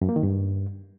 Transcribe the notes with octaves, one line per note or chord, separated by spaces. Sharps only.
F#2
A#3
D#3
G2